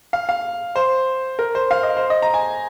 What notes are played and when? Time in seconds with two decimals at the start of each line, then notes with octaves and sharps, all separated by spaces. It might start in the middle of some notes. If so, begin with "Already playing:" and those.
0.13 F5
0.29 F5
0.76 C5
1.39 A#4
1.55 C5
1.71 F5
1.83 D#5
1.97 C5
2.10 D#5
2.22 A#5
2.34 G#5